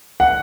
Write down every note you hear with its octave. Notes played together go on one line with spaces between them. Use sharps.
F#5